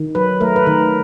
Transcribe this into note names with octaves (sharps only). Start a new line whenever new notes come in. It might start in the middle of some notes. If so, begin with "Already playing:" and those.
Already playing: D#3
F#3 B4
A3 A#4
B4
D#3 A#4